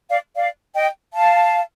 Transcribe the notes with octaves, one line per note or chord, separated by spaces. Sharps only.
D5 F5
D5 F5
D#5 G5
F5 A5